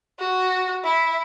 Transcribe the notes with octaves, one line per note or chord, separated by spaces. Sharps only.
F#4
E4